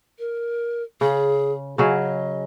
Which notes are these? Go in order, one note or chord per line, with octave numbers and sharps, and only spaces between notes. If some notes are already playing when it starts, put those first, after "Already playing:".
A#4
C#3 G#4
C#3 F#3 G#4 D#5